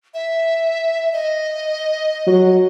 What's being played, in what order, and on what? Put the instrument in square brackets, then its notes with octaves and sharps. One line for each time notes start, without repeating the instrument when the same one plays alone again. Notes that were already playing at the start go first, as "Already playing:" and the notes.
[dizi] E5
D#5
[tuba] F#3